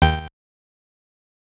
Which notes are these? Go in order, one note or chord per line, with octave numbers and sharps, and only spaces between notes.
D#2 G5 G6